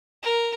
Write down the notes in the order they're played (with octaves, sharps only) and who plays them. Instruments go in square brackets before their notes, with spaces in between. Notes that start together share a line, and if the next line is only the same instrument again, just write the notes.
[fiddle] A#4